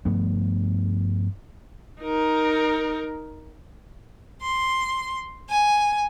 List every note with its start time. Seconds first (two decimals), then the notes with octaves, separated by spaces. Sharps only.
0.05 G2 F3 A3 B3
2.01 D#4 A#4
4.41 C6
5.48 G#5